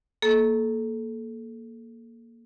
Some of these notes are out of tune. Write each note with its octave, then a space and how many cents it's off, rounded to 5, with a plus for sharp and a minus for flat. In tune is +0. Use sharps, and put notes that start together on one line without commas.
A#3 +0 A4 -25